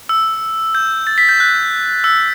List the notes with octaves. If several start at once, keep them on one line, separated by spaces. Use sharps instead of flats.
E6
G6
A6
B6
G6
F#6
E6